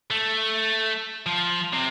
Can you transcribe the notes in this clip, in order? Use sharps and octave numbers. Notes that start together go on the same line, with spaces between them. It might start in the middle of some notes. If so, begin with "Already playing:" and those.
A3
F3
C3